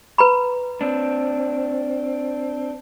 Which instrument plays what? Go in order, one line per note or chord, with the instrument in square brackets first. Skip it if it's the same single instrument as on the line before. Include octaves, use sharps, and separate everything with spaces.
[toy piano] B4 A#5 B5
[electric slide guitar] C4 D4